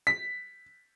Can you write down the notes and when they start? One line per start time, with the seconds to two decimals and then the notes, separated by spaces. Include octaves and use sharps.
0.07 B6